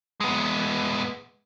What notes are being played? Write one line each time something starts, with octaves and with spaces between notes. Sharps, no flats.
G#3 B3